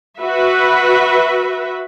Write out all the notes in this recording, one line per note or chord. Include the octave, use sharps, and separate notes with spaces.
F#4 B4 E5